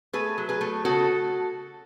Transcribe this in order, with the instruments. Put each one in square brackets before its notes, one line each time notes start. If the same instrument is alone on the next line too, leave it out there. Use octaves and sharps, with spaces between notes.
[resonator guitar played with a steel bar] A3 G#4 B4
F#3
G#4 B4
A3
C#3 F#4 A4